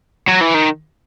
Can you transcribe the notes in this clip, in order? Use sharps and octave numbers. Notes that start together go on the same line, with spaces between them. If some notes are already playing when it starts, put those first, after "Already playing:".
F#3
E3
D#3